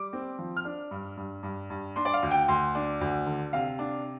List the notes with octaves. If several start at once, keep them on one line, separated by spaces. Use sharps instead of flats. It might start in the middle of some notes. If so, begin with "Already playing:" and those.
Already playing: G3 D6
C4
F3
F6
D4
G2
G2
G2
G2
D4 C6
D5
F5
D2
G5
D2 C6
D4
D2
D3
C3 F5
D4